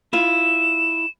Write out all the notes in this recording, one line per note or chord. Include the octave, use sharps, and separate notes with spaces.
E4 F4 E7